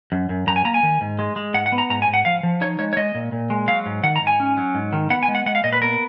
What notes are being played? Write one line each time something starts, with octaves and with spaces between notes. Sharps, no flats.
F#2
F#2
F#2 A#5
G#5
A#3 A#5
G#5
D#3
G#2
G#3
G#3
G#2 F#5
F#5
B3
A#5
G#2 A#5
G#5
G#2
F#5
F3 F5
F3
D#4 C#5
G#3 C#5
C#5
G#3 D#5
A#2
A#2
G#3
F#3 F5
G#2
D#3 F#5
A#5
G#2
G#5
C#4
F#3
G#2
D#3
B3 F#5
G#5
G#3
F#5
G#3 F#5
F5
A#2 D#5
B4
B3 A#4